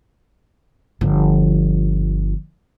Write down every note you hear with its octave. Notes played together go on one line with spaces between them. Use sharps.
G1 F3